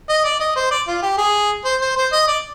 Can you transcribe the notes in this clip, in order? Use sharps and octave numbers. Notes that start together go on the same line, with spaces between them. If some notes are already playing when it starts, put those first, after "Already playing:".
D#5
D5
D#5
C5
D5
F4
G4
G#4
C5
C5
C5
D#5
D5